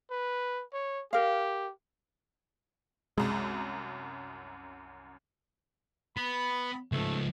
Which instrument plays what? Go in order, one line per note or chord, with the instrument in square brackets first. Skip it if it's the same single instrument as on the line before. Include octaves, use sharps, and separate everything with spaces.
[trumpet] B4
C#5
[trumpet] G4 [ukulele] A#4 F5
[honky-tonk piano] C2 F#2 [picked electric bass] G#3
[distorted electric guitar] B3 [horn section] B5
[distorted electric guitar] C#2 F3 [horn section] A3